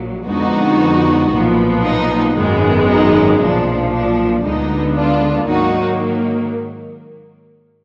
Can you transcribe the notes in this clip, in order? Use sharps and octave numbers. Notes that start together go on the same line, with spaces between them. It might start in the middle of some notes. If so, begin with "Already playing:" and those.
Already playing: A#1 A#2 F#3
F2 D3 G#3 B3 D#4 F#4
B1 A#2 F3 B3
D#4
G#1 F#2 D#3 G#3 B3
D#4
B1 A#2 F3 D4
D4
D2 D3 G#3 B3 D#4
D4 F4
G#2 D#3 F#3 A#3 D#4 F#4